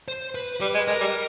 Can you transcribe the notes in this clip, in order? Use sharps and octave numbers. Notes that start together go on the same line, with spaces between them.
C5
B4
G3 B4
G#3
G#3 A#4
G3